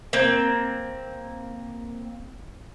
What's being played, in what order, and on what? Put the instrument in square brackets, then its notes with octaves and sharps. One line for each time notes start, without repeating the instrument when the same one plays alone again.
[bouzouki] A#3 C4